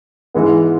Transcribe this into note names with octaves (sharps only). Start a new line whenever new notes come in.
G#2 E3 G#3 B3